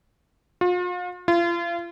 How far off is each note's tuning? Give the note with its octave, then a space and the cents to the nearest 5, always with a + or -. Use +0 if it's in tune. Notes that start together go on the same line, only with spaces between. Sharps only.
F4 +40
F4 -35